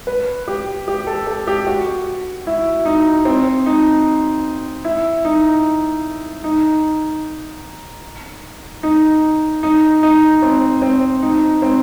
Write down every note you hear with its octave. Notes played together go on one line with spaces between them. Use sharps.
B4
G4
G4
A4
A4
G4
F#4
E4
D#4
C4
D#4
E4
D#4
D#4
D#4
D#4
D#4
C4
C4
D#4
C4